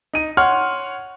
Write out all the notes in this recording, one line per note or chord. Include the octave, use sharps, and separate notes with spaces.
D#4 D#7
C#5 F#5 C6 F6